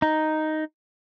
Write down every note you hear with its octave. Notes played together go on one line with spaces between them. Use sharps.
D#4